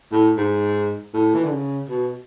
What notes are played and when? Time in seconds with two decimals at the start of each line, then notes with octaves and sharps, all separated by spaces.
0.12 A2
0.37 G#2
1.13 A2
1.35 E3
1.44 D3
1.51 C#3
1.89 B2